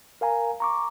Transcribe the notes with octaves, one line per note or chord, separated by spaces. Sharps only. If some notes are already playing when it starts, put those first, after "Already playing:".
A#4 F5 G#5 A#5
A#5 C#6 D6